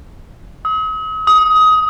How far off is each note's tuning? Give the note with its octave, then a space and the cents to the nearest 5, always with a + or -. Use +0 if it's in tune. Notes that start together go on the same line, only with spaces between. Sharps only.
D#6 +45
D#6 +20